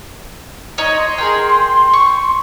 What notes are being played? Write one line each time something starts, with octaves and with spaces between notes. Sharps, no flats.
D#4 C#5 D#5
C6
G#4 A#4 G5
C#6